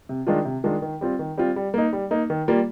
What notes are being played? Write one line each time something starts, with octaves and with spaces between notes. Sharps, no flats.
C3
D#3 G#3 D4 F4
C3
D#3 G#3 D4 F4
D#3
G3 C4 F4
D#3
G3 C4 F4
G3
A#3 D#4
G3
A#3 D#4
D#3
G3 A#3 F4